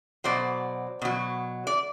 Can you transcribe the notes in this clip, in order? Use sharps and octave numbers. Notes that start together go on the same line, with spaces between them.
B2 F#3 C5 D5
B2 F#3
D5